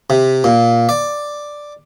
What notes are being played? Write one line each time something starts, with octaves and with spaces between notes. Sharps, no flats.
C3
A#2
D5